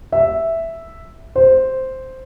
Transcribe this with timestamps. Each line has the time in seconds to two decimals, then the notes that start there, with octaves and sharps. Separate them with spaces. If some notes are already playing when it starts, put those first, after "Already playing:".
0.12 E5
1.36 C5